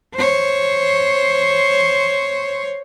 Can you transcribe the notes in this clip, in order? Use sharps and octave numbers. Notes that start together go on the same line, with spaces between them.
C5 C#5